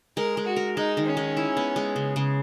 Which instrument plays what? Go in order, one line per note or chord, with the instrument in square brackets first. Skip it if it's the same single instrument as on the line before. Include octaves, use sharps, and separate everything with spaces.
[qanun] G#3 [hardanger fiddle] A#4
[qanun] G#3
[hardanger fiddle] F#4
[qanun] A#4
[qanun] G#3 [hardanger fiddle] D#4
[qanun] D#3
[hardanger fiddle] C#4
[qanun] G#3
E4
B3
G#3
C#3
C#3